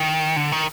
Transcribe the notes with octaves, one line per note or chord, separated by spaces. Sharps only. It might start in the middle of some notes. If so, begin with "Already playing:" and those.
Already playing: D#3
D3
D#3